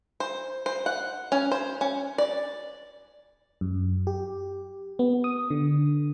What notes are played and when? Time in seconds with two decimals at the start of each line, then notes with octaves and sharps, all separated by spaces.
0.20 C5
0.66 C5
0.86 F#5
1.32 C#4
1.51 C5
1.81 C#4
2.18 D5
3.61 F#2
4.07 G4
4.99 B3
5.24 D#6
5.50 D3